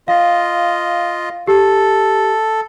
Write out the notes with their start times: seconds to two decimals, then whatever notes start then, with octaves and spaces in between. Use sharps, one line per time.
0.08 F4 D#5 F5
1.48 G4 A4